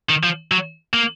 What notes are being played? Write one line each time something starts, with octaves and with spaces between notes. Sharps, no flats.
D#3
F3
F#3
A#3